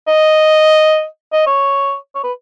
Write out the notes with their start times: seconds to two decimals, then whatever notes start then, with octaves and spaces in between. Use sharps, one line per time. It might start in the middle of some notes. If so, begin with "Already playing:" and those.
0.08 D#5
1.33 D#5
1.47 C#5
2.15 C#5
2.24 B4